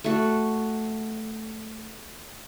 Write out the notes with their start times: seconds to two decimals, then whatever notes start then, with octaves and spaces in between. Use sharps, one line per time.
0.04 A3 F#4